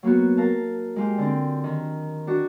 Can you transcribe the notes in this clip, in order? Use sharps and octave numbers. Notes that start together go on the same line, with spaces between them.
F#3 A#3 B3 F#4
A#4 F5 A5
G#3 F4 G4
D3 C4
D#3
D4 F#4